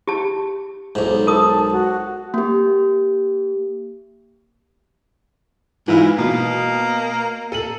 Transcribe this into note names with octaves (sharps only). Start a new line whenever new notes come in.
G4 A5
B1 G#2
A#4 A5 D#6
F#4
A#3 G4
G#2 E3 E4 F4
B2 A#3
A4 D#7 F#7